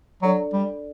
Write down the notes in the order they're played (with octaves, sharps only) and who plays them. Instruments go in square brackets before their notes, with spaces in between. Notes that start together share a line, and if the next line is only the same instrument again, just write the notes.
[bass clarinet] F#3 [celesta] D4 A4 D5
[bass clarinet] G3